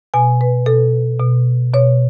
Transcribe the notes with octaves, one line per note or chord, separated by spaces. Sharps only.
B2 G#5
B4
B2 A4
B2
B2 C#5